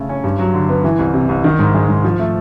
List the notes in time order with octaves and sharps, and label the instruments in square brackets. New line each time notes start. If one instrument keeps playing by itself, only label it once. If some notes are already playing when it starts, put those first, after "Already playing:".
Already playing: [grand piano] C#3 A3
C#4
G2
F#3
D3
B3
E3
C2
C3
C2
D#3
G#2
G#3
G#2
F3
A3